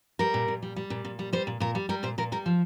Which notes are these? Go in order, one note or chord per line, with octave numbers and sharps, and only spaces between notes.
G3 A#4
A#2
A#2
G3
G3
A#2
A#2
G3
G3 C5
A#2
A#2 A#4
G3
G3 A#4
A#2 C5
A#2 A#4
G3 A#4
F3